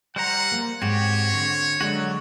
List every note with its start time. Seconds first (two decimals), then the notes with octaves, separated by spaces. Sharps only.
0.16 G3 C5 F#5 A#5
0.52 A#3
0.82 G#2 C4 F#4 G4 C#5
1.34 D3
1.81 D3 F#3 G#3 D4 F#4